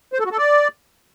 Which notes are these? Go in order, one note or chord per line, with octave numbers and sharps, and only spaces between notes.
C5
A4
F#4
A4
D5